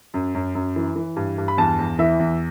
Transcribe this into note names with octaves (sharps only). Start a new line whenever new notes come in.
F#2
F#2
F#2
E3
E3
G2
G2
B5
E2 A5
E2
E3 E5
E2